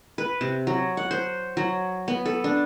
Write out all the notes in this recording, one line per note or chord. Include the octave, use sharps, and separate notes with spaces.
B4
C3
F#3
F#5
C5
F#3
B3
A4
D4